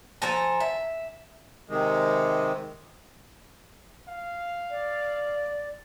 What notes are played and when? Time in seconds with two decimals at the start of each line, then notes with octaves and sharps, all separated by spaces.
0.22 F3 A4 G#5 A#5
0.60 E5
1.69 C3 D#3 G#3
4.08 F5
4.71 D5